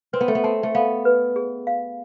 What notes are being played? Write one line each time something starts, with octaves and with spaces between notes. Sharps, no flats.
C4 B4
B3
A3
B3
C4 A5
A3
B3 F5
B4
G#4
F5